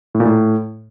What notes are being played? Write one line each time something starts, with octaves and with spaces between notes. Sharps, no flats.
A2
A#2
A2